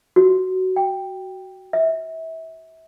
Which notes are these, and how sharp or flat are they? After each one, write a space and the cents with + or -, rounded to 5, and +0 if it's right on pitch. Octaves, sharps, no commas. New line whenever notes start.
F#4 +15
G5 +5
E5 -30